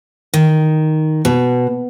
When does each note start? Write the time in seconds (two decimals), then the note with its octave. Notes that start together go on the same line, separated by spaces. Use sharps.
0.34 D#3
1.25 B2